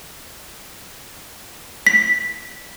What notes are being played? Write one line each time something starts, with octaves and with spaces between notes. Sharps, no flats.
B6